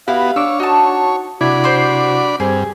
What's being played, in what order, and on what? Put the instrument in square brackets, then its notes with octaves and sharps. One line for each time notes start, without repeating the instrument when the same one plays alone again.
[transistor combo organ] B3 F#4 [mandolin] E4 [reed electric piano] G4 [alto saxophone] F5
[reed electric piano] D4 D6 [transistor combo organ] C#5 [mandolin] E6
[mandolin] D#4 A5 [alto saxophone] F#4
[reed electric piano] C3 E4 G#6 [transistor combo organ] D4 D5 B5 [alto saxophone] F#4
[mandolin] C5 C6
[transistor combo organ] G2 [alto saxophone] C4 [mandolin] G#4